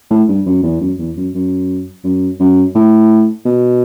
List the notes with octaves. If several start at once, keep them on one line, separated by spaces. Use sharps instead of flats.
A2
G2
F#2
E2
F#2
E2
F#2
F#2
F#2
F#2
A2
B2